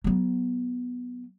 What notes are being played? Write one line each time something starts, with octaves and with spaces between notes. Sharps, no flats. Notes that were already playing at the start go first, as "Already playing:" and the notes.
F#3 B3